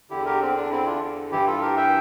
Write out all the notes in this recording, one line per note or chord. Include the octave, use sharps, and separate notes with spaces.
E2 D3 E4 G4
G4 A#4
C4
D4
C4 E4
D4 F4
G2 E3 E4 G4
F4 A4
G4 A#4
E5 G5